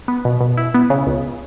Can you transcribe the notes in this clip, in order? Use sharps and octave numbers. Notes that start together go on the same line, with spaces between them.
B3
B2
B2
E4
B3
C#3
C#2